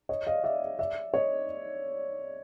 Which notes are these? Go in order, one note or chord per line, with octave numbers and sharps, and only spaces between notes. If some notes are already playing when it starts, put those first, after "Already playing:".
C#5 D#5
D#5 F5
D5 E5
D5 E5
C#5 D#5